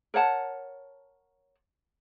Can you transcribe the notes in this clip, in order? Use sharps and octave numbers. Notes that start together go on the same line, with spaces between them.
A#4 C#5 F#5 A5